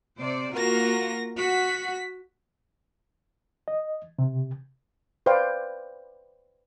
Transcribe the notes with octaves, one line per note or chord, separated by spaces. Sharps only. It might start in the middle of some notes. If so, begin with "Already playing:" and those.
C3 C5 D5
A#3 F4 F#4 A#4 A#6
F#4 B6
D#5
C3
B4 C5 D5 F5 G5